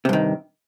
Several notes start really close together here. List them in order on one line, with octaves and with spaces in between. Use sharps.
C3 G2 D#3